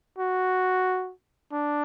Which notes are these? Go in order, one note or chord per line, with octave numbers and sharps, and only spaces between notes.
F#4
D4